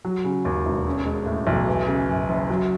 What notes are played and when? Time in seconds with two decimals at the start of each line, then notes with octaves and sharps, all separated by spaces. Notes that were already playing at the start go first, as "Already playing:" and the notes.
0.05 F#3
0.24 C#3
0.45 D#2
0.66 E1
0.87 C#4
1.06 G#3
1.26 A2
1.47 B1
1.67 E3
1.87 C#3
2.09 F#2
2.29 F#1
2.50 F#3